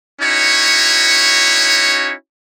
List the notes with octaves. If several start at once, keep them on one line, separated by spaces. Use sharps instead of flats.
C#4 D#4 E4 F#4 C#5